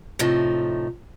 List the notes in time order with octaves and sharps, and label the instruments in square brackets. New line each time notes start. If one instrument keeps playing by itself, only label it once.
[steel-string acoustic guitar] A2 C3 F3 A3 D#4